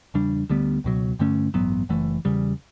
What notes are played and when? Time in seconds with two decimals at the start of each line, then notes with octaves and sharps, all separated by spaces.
0.14 E2 C#3 G3 D4
0.50 D2 D3 G3 B3
0.84 C#2 B2 F#3
1.19 G2 D3 A3 C#4
1.54 A1 G2 F#3 B3
1.89 F#1 F#2 E3 A3
2.25 E2 C#3 G3